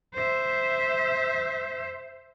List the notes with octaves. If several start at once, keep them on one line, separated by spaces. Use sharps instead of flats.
C5 E5